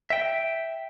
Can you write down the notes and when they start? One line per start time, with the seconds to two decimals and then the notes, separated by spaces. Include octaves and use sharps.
0.10 E5 G5